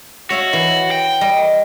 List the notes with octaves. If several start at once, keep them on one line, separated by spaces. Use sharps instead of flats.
F#4 C#5 E5 F5
E3 C#5
G5
G3 D#5